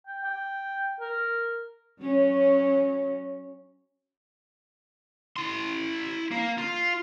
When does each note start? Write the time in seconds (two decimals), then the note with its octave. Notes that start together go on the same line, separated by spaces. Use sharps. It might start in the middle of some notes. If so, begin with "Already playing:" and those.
0.07 G5
0.24 G5
1.01 A#4
2.01 F#3 C#4
5.37 E4 C6
6.32 A#3
6.58 F4